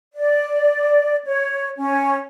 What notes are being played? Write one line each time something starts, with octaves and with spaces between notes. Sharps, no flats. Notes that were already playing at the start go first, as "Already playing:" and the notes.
D5
C#5
C#4